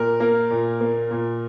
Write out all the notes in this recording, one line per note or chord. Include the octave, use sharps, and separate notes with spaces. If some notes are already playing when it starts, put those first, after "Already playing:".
Already playing: A#2 A#4
A#3 A#4
A#2
A#3
A#2